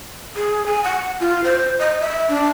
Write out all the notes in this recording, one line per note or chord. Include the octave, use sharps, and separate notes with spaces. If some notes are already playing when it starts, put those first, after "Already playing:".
G#4
G#5
F#5
F4
C5
D#5
E5
D4